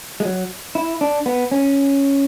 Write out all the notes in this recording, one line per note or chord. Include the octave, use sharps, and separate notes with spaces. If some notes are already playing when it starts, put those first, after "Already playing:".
G#3
F#3
E4
D4
B3
C#4